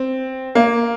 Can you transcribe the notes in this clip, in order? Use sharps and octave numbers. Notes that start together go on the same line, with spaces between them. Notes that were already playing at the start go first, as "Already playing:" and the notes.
Already playing: C4
A#3